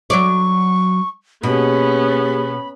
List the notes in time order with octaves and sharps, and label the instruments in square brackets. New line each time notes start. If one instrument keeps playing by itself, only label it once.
[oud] F#3 C#5 D5 [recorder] C#6
[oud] B2 [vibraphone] A#3 G4 G#4 [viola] B3 C#4 [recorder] B5